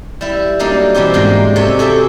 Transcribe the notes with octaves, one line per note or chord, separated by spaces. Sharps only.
G3 E4
F#3 G3 A#3 D4 D#4
B2 E3 B3 C4 G4
G#2 G#3 A#3 D4 G5
C3 G4 A4 C#5 D5
F#4 G#4 A4 E5 G5